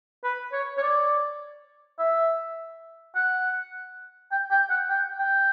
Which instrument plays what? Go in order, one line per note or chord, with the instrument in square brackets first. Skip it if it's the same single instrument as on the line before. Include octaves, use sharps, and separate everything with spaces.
[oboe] B4
C#5
C#5
D5
E5
F#5
G5
G5
F#5
G5
G5